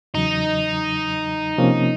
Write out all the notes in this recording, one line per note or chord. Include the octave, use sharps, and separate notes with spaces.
E2 C#3 F#3 D#4
C3 F3 A#3 C#4